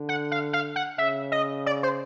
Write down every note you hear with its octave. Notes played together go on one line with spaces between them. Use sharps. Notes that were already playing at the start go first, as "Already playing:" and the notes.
Already playing: D3
F#5
F5
F5
F#5
C#3 E5
D#5
D5
C5